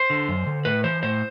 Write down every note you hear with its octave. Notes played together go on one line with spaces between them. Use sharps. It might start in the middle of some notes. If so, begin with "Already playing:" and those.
Already playing: C5
D3
F#2
D3
A2 B4
E3 C5
A2 C5